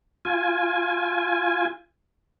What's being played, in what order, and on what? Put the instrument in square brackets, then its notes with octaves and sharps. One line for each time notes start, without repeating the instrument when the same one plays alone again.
[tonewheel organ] F4 G#5